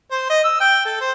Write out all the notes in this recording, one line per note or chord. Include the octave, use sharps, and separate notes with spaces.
C5
D#5
E6
G5
A4
C5